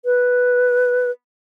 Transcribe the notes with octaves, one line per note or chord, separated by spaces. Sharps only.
B4